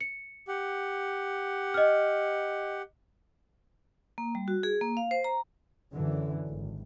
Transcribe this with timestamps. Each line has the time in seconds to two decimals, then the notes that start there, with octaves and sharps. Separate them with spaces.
0.01 C#7
0.48 G4 F#5
1.74 D#5 F6
4.18 A#3
4.35 G3
4.48 F#4
4.63 G#4
4.81 A#3
4.97 F5
5.11 C5
5.24 A#5
5.92 F#2 D3 E3
6.47 G#1